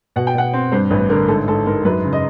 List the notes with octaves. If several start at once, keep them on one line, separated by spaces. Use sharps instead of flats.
B2 F#5
G5
B2 F#5
C4
G2 C5
A1 B4
D3 A#4
G#2 A4
G#2 A4
G#2 A#4
F#2 B4
C#3
D#5